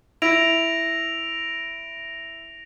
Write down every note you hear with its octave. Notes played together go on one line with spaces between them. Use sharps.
E4 A#6 D7 F7